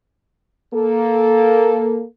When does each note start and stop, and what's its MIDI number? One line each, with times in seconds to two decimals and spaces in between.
0.74 2.04 58
0.74 2.04 69